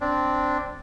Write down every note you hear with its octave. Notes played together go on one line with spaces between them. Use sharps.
C4 D4